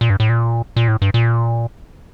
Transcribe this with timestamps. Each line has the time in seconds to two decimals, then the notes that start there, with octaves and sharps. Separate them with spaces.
0.01 A#2
0.10 G2
0.20 A2
0.29 A#2
0.76 A#2
0.88 A2
1.02 G2
1.14 A#2